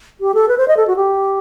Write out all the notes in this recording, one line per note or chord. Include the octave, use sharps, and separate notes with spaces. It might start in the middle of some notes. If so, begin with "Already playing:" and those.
G4
A4
B4
C5
D#5
A4
F#4
G4